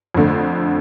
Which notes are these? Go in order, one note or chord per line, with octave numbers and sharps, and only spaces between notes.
F2 D3 A3